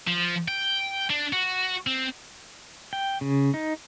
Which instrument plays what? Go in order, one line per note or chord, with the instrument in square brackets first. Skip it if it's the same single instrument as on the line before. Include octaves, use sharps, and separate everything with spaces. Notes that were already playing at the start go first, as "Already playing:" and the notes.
[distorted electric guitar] F3
G5
D4
F#4
C4
[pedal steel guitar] G5
C#3
D#4